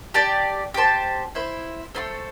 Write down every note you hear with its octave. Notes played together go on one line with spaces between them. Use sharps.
G4 D5 A5
G4 C5 A5
E4 C5 E5
A3 E4 A4 C5